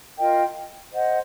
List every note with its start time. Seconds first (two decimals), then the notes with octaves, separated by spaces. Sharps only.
0.18 F4 A#4 D#5 G5
0.92 C5 D#5 F#5